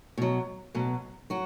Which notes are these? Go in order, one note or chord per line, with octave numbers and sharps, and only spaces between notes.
B2 F#3
B2 F#3
F#3 F#4